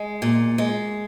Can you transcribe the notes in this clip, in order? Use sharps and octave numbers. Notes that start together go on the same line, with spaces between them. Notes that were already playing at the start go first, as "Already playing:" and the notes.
Already playing: G#3
A#2
G#3